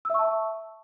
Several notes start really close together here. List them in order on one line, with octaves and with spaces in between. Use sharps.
E6 E5 C#6 A5